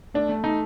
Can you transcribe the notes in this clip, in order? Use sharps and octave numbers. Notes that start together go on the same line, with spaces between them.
A3 D4
A3
A3 D#4